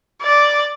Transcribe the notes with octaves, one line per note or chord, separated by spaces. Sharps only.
D5